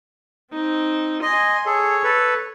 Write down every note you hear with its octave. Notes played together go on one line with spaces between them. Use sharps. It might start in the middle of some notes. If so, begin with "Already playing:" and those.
C4 D#4
D#5 G#5 C6
G#4 A4 C#5
A4 B4